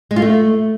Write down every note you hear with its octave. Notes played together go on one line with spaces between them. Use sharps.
G#3
F4
A3